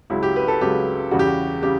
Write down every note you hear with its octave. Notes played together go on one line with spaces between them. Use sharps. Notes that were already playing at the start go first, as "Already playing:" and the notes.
C#2 C#3 F#3 E4
G4
B4
A4
C#2 C#3 F#3 G4
E2 C#3 G3 F#4
G4
F#4
C#3 G3 G4